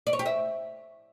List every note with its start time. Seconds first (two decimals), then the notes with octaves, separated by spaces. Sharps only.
0.07 D5
0.13 C#5
0.19 G4
0.26 E5